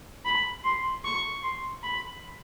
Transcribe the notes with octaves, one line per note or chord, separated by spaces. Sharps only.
B5
C6
C#6
C6
B5